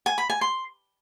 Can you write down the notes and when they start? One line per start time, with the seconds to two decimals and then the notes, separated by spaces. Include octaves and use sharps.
0.06 G#5
0.18 B5
0.30 G#5
0.41 C6